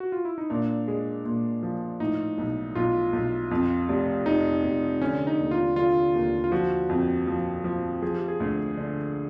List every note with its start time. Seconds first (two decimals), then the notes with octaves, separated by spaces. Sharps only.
0.00 F#4
0.12 F4
0.25 E4
0.38 D#4
0.50 A#2 D4
0.88 G#3
1.25 A#2
1.63 F3
2.00 A2 D#4
2.38 B1
2.75 B1 F4
3.13 B1
3.51 F2
3.89 F1
4.26 F1 D#4
4.64 F1
5.01 D3 C#4
5.27 D#4
5.39 D#2
5.51 F4
5.76 D3 F4
6.14 D#2
6.44 F4
6.52 F3 F#4
6.89 F2
7.27 F3
7.64 F3
8.02 F3 G#4
8.15 G4
8.28 G#4
8.40 D2
8.77 D3